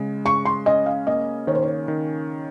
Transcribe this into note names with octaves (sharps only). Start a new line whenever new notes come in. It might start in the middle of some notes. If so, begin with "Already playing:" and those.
Already playing: C#3 G#3
C#3 C#6
C6
C#4 D#5
F5
A#3 D#5
D#3 C#5
C5
C#5
D#3